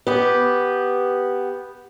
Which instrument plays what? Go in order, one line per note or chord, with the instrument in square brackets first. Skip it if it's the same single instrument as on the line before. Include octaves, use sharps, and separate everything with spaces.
[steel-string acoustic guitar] B3 G4